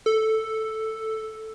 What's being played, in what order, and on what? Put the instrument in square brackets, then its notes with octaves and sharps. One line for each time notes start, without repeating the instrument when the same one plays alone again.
[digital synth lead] A4